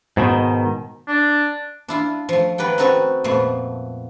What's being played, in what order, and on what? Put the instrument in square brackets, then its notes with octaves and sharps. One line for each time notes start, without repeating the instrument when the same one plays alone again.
[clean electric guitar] G#2 B2 D#3
[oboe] D4
[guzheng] D4 E4 F4
F3 A3
D#3 B4 D5 F#5 G5
C4 D#4 F#4 A4 B4 C#5
F2 A#2 F3 A3 B3 C#5